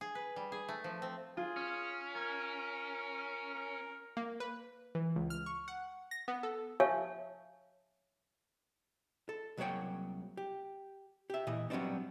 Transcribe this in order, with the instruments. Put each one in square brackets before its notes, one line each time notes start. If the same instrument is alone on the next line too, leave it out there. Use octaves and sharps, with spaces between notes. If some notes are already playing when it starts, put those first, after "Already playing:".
[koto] G#4
B4
G3
G#4
A3
F3
C4
[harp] F4 [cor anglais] G#4
[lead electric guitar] C#4
[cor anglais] A#4 [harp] G#6
[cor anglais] A#4
[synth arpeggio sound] A#3
B4
E3
C#2
F6
C#6
F#5
A#6
B3
A4
[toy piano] C#5 E5 F5 G#5 A5 C#6
[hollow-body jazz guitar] A4
C2 F#3 A#3 G#4 C#5 G5
G4
G4 E5
A#2 E3 D#5
F#3 G3 B3 C4 D4 D#4